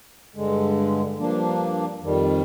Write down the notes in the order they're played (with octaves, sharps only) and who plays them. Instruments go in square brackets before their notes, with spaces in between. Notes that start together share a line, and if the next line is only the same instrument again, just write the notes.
[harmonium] G2 D3 G#3
G2 F3 A#3 D4
F2 D#3 G3